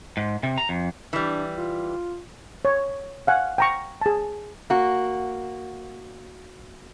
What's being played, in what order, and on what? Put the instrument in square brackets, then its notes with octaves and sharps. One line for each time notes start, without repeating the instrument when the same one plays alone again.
[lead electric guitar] G#2
C3
A#5
F2
[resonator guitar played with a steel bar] E3 G3 [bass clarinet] D4
[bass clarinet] F4
[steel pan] C#5
F5 F#5 G#5
G5 A#5 C#6
G#4 A5
[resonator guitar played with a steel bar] A#3 F#4